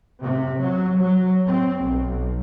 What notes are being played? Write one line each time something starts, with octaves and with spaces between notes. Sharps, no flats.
C3
F#3
F#3
C4
B1